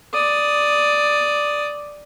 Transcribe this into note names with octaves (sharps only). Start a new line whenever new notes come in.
D5 D#6